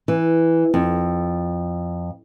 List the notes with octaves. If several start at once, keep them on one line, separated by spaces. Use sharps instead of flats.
E3
F2